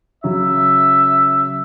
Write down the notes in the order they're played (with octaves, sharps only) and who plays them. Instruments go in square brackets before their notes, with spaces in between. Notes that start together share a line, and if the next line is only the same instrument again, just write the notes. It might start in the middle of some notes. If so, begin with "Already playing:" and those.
[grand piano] C#3 F#3 [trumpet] E5